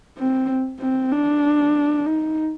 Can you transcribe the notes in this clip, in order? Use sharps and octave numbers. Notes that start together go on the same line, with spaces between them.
C4
C4
D4
D#4